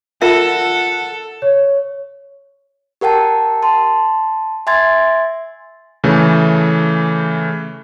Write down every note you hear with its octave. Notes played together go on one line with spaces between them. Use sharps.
F4 A4 A#4 E5 F#5
C#5
G4 A#4 F#5 G5 A5
A5 C6
E5 G#5 C6 G#6 A6
C#3 E3 A3